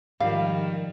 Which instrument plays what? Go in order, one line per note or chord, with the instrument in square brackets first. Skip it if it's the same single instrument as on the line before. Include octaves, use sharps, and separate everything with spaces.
[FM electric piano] G#2 F3 [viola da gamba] D#3 [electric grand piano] G3 [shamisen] F5